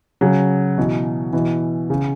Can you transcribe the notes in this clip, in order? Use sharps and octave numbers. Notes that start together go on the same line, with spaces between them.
C#3 F#3
B2 E3
B2 E3
C#3